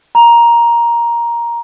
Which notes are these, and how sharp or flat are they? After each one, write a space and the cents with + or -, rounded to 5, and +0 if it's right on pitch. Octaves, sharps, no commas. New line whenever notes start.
A#5 +10